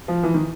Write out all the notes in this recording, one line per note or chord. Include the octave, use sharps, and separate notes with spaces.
F3
E3
D#3